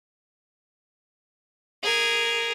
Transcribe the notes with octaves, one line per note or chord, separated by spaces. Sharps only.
G#4 A#4